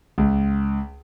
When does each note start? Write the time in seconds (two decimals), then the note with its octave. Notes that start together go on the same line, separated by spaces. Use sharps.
0.18 C#2